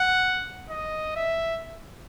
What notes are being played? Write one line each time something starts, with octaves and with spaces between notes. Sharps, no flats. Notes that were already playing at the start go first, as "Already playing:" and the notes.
Already playing: F#5
D#5
E5